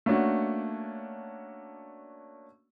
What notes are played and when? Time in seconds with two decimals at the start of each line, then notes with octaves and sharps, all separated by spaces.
0.06 A3 A#3 C#4 D4 F#4